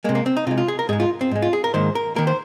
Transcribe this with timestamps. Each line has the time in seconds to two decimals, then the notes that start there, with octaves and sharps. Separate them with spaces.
0.04 G#3 A#3
0.09 C3
0.15 A#3
0.26 C4
0.37 D#4
0.47 C3 F4
0.51 G#3
0.58 F4
0.68 G#4
0.79 A#4
0.89 G#2 G#3 G#4
1.00 F4
1.21 C4
1.31 G#2 G#3
1.42 F4
1.53 G#4
1.64 A#4
1.74 G#2 D#3 A#3 C5
1.95 A#4
2.16 D#3 A#3 A#4
2.27 C5